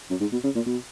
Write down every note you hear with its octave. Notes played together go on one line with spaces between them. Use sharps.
F#2
G#2
B2
C#3
A#2
B2